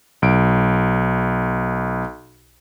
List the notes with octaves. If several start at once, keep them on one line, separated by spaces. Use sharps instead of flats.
B1 D7